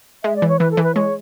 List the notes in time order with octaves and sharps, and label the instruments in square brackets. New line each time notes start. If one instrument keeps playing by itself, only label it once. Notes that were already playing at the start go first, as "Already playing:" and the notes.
[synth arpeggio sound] G#3 [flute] E5
[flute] D5
[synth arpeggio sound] E3
[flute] C#5
[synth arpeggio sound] E3 [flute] B4
[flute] A4
[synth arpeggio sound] E3
[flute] B4
[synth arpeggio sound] G#3 [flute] C#5